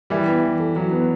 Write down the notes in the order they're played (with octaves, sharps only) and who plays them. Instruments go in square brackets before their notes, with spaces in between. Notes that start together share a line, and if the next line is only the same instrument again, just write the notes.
[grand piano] E3 G3 [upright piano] E4
[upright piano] B3
E3
A4
[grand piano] F#3 [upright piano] E4
[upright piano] B3